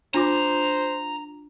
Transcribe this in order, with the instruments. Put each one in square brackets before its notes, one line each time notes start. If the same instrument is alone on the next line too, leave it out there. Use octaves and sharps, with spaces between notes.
[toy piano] D4 F4 D6 [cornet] C5 [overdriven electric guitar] A#5